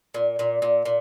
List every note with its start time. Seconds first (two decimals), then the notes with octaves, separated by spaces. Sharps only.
0.14 A#2
0.39 A#2
0.62 A#2
0.85 A#2